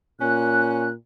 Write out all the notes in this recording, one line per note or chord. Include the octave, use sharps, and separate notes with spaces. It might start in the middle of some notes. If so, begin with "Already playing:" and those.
A#2 C#4 F#6